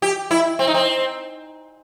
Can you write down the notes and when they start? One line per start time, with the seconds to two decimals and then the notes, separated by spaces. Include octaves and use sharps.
0.02 G4
0.31 E4
0.59 C4
0.67 D#4
0.74 C4